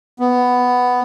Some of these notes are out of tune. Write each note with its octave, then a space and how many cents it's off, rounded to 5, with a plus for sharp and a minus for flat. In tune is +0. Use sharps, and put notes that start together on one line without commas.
B3 +5